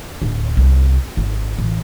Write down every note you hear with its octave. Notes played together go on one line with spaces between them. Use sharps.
D1
C2
G#1
A1